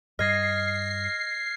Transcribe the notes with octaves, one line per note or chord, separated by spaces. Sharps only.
G2 G3 D#5 F6 G#6 A#6 C7